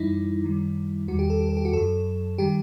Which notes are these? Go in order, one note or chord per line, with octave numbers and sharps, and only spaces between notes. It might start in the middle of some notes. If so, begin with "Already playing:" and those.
Already playing: F#2 E3 G3 D#4 E4
F#2 D#3 G3
E2 D#3 G3 F#4
G4
A4
G4
A4
G4
F#4
F#2 F#3 A4
D#3 G3 G4